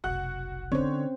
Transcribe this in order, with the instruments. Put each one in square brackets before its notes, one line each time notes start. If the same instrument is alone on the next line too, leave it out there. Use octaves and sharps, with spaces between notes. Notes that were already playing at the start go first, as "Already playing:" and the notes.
[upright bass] F1 B1 [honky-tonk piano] F#4 F#5 F#6
[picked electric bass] D3 [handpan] C4 C#4 C5 [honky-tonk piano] C#5